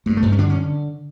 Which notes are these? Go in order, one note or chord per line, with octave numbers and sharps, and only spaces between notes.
G2 A3
A3
G2
C#4
D3 D4
C#4
D3